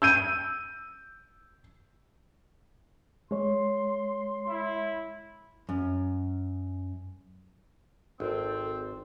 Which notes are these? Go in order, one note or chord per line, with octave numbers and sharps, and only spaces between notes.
E6 G6 D#7
G#3 C#5 C6
E4
F#2
G#1 C4 A4